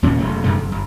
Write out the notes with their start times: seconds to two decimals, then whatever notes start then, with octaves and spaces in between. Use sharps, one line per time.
0.03 D#2 A#2 C#3 C#4
0.19 F#1 C3 A3
0.44 F#2 C3 D#3 A3
0.59 F#1
0.72 G1